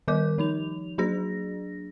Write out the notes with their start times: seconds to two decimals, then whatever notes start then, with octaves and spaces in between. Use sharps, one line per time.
0.08 D#3 G3 A#4 D6 G6
0.38 F3 D#4 F7
0.98 F#3 D4 G#4 A#6